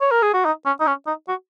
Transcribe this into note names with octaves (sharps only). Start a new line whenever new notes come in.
C#5
A#4
G#4
F#4
D#4
C#4
D#4
C#4
D#4
F#4